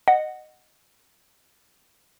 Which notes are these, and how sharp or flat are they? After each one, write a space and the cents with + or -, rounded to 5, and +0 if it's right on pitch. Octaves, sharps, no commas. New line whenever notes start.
D#5 -15 F#5 +0